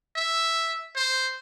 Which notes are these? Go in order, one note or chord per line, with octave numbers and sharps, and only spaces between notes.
E5
C5